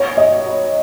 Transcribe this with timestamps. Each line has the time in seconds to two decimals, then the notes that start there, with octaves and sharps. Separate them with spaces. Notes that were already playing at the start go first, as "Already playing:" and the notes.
Already playing: G#3 B3 C#4 D#4 G#4 C#5
0.17 D#5
0.45 F#3 B3 D#4